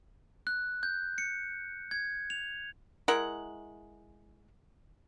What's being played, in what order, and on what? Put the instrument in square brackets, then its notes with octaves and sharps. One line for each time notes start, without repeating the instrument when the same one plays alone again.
[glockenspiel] F#6
G6
C#7
G#6
F7
[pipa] G#3 E4 A#4 F#5